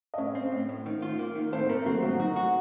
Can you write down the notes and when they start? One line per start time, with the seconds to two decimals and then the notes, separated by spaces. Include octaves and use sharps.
0.14 D#5
0.18 A2 C#4 C#5
0.35 C4
0.51 A2
0.69 A2
0.86 D#3
1.02 F4
1.19 A#3
1.35 D#3
1.52 A2 C4 C5
1.69 A3 A#3 A#4
1.86 F#3 C4 F#4
2.03 A2 F#3 F#4
2.20 D#4 F#4
2.36 F#4